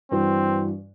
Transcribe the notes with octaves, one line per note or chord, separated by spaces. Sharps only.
G2 E3 C4 F#4